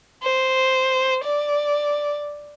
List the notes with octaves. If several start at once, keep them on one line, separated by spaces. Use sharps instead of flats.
C5
D5